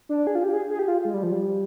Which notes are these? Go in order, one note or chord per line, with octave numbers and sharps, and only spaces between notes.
D4
G#4
F4
G4
G#4
G#4
G4
F4
G#3
G3
F3
G3